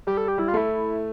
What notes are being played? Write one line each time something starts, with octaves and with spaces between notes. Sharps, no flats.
G3 G4
A4
G4
G3 E4
F4
A3 E4